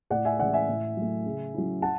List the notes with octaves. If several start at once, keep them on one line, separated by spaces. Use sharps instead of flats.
A2 D5 F#5
E5 G#5
E3 G#3 C#4 E4 D5 F#5
E5 G#5
A2
F#3 A3
C#3
F#3 C#4 E4
F#5 A5